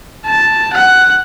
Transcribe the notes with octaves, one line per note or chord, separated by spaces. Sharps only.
A5
F#5